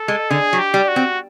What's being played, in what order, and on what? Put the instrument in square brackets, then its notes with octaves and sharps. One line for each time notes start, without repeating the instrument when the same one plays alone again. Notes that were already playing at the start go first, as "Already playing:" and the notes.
Already playing: [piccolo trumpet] A4
[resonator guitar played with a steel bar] G#3
[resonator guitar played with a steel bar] D3 [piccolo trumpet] G#4
[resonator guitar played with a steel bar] F#3
[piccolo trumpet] G4
[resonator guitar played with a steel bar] G3
[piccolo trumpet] F#4
[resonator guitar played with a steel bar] C4